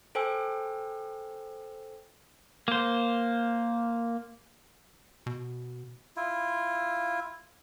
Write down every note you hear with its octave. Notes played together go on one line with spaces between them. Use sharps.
A4 C5 G5 G#5 E6
A#3 C5
B2
E4 F4